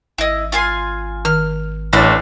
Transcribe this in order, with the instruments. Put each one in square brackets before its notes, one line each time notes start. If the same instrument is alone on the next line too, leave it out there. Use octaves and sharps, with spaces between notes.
[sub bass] G#1 [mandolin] E4 D#5
[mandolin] F4 G#5 C6
[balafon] D#3 [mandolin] F6
[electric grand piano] A1 [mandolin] A3 D4 B4 [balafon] E4 C#5